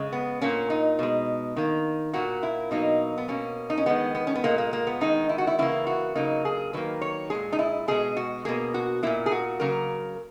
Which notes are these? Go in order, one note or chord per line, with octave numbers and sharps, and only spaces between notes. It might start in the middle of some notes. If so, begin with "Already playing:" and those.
Already playing: C#3 G#3
B3
A#2 A#3 C#4
D#4
B2 G#3
D#3 A#3
A#2 A#3 F#4
E4
B2 F#3 A#3 D#4
B3
B2 A#3 C#4
D#4
C#4
D#3 G#3 B3
B3
C#4
B3
A#2 G#3 A#3
A#3
A#3
B3
D#3 G#3 D#4
E4
F#4
E4
C#3 E3 A#3 E4
F#4
C#3 F#3 A#3 D#4
G#4
D#3 F#3 A#3 B4
C#5
A#2 G#3 G#4
D#4
E4
B2 G#3 G#4
F#4
B2 A#3 G#4
F#4
A#2 A#3 E4
G#4
F#4
C#3 F#3 A#3 A#4